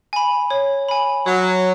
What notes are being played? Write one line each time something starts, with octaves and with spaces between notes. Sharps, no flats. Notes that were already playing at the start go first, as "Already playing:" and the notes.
G#5 B5
C#5
G#5 B5
F#3 C#5